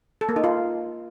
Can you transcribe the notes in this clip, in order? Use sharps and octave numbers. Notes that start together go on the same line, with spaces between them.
A4
A#3
D#4
F4